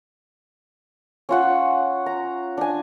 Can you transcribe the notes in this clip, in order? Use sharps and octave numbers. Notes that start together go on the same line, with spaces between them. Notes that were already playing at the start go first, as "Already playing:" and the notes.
C#4 F4 F#5
A#5
D4 G#5